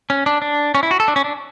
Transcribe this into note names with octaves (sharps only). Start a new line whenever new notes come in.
C#4
D4
D4
C#4
E4
F#4
A4
D4
C#4
D4